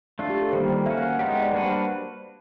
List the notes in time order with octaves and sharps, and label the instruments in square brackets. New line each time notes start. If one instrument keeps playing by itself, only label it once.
[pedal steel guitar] A3 D4 F4
[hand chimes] G4
A4
[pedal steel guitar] D#3 G3 A#3 [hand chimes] C5
[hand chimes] C5
[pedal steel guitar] A#3 C#4 F#4 [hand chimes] E5
[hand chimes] F5
F#5
[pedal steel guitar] G#3 B3 D#4 G4 [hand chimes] F#5
[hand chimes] D5
[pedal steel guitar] G3 A#3 D4 F#4 B4
[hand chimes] C5